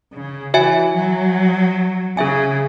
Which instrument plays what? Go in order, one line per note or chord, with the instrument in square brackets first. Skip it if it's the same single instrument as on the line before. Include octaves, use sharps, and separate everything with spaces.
[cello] C#3
[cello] E3 [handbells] F#4 C#5 E5 G#5
[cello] F#3
[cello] C#3 [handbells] C#4 G#4 E5 G#5